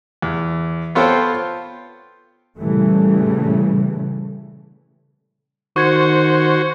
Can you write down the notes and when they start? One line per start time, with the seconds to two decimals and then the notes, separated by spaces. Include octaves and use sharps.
0.22 E2
0.95 B3 F4 A4 C5 C#5 G5
2.58 A#2 C#3 E3 G3 A3
5.76 D#3 F#4 C5 C#6 G#6 C#7